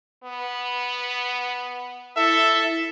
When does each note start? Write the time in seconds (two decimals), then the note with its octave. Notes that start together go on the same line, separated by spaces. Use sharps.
0.24 B3
2.17 E4 A4 E5